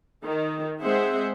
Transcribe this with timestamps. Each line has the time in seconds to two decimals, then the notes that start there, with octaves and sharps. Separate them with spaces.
0.24 D#3
0.81 G#3 C4 G#4 C5 E5 F#5